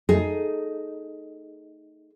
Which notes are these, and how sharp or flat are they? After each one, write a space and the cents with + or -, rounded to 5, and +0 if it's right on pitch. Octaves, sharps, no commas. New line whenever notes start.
A3 +5 D#4 +0 G#4 +10